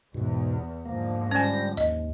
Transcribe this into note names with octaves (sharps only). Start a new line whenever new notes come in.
E2 G#2 B2
G#2 D3 F3 A#3
G3 C#4 G#5 A#6
D#2 D#5